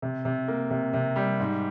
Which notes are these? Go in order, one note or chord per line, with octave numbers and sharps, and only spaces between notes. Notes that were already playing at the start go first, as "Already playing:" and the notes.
C3
C3
A#3
C3
C3
G3
G#2